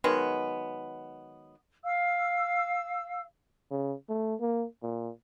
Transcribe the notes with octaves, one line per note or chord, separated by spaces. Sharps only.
D#3 F#3 G#3 B3
F5 E6
C#3
A3
A#3
A#2